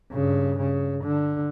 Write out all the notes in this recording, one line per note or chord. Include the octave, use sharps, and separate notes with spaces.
G2 C#3
C#3
D3